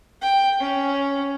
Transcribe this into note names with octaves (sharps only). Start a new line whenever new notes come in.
G5
C#4